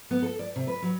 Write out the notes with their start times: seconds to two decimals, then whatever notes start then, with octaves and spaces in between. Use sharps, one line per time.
0.11 B3
0.22 A4
0.39 D5
0.56 C3
0.67 B4
0.82 F#3